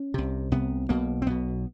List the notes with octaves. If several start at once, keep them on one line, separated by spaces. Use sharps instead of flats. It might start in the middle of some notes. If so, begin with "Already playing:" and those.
Already playing: C#4
C2 C3
C2 C3 B3
B1 B2 A#3
C4
B1 B2 B3